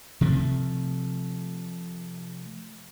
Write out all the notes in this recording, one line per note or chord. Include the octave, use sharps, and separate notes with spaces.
C3 F3 A3